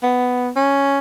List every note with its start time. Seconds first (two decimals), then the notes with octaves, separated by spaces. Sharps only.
0.03 B3
0.56 C#4